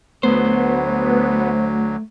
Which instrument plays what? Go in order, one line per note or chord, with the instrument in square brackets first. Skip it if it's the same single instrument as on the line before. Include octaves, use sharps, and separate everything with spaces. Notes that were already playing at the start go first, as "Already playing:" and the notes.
[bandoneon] D2 F#3 [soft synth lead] A3 [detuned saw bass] B3 [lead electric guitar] C5